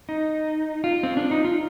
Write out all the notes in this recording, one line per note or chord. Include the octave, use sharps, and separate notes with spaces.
D#4
F4
C4
D4
D#4
F4